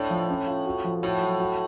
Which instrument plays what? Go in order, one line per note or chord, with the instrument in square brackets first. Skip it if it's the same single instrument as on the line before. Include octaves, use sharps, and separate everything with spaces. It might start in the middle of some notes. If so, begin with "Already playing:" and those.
Already playing: [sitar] A2 [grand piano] D4
[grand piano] F3
C#4
F4
F#4
F3
[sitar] A2 [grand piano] F#4
[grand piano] F#3
F#4